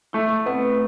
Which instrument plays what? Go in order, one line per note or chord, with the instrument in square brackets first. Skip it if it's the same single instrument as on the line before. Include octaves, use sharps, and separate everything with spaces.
[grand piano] A3 [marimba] E4
[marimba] A3
[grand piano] B3 [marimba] C4
[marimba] E4